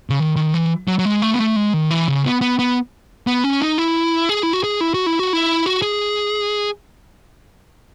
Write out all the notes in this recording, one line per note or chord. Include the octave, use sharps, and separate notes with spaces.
C#3
D#3
D#3
E3
F#3
F#3
G#3
A3
B3
A3
G#3
D#3
E3
C#3
B3
B3
B3
B3
C#4
D#4
E4
G#4
E4
F#4
G#4
E4
F#4
E4
F#4
E4
F#4
G#4